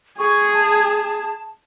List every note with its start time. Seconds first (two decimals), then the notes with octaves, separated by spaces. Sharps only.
0.19 G#4 C#6
0.53 A5